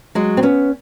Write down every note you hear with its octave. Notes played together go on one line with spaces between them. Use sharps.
F#3 G#3
C4
B3 C#4